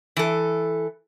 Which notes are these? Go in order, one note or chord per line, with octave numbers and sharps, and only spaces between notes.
E3 A4